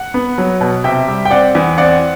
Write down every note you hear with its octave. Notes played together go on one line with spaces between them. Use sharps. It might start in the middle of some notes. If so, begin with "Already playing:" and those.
Already playing: F#5
B3
F#3
B2
C3 E5 G5
G3
G5
C4 D5 F#5
E2
C4 D5 F#5